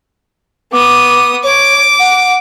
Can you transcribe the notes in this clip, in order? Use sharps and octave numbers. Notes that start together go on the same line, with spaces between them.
B3 D6 D#6
C#5 D6
F#5